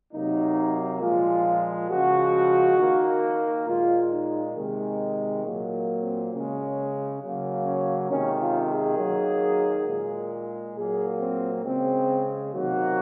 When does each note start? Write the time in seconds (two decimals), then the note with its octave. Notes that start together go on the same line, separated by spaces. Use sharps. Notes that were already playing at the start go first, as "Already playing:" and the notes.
0.12 C3 F#3 A#3 D#4
1.01 A#2 F3 G#3 F4
1.89 C#3 F3 G#3 F#4
2.78 D#3 A#3
3.66 A#2 G#3 F4
4.11 D#4
4.55 C3 D#3 G#3
5.43 A#2 F#3 A#3
6.02 C4
6.32 C#3 G#3 C#4
7.21 C#3 F#3 A#3
7.65 C#4
8.09 C3 D#3 G#3 C#4
8.39 F4
8.68 G#4
8.98 D#3 F#3 A#3
9.87 A#2 G#3
10.74 A#2 F#3 A#3 G#4
11.19 C4
11.63 C#3 G#3 C4
12.52 C3 D#3 F#3 A#3 F#4